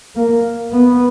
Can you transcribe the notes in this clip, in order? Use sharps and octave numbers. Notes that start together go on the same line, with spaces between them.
A#3
B3